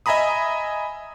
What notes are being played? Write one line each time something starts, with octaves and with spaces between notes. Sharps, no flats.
D#5 E5 G#5 A#5 B5 D#6